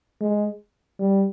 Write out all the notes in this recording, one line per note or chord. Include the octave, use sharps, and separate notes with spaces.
G#3
G3